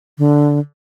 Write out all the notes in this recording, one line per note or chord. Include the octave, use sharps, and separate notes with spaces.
D3